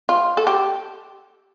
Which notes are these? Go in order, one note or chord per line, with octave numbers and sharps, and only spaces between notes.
F4
A4
G4